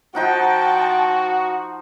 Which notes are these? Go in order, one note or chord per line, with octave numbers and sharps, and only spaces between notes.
F3 D#4 F#4 F#5 G5 A5